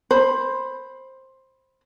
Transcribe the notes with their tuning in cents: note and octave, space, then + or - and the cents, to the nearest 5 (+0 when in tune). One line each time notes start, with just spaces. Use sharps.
C5 +15 B5 +5